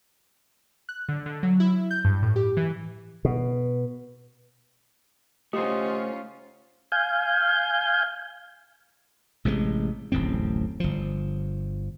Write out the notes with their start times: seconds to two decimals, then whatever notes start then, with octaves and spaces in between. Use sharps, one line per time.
0.89 F#6
1.09 D3
1.26 D3
1.43 F#3
1.60 E4
1.91 G6
2.05 G2
2.22 A2
2.36 G4
2.57 E3
3.25 B2
5.53 A3 C#4 F4 G4 C5 D#5 D#6
6.92 F5 G#5 G6
9.45 A1 C3 E3 G#3
10.12 D1 A1 F2 C4
10.80 G1 F3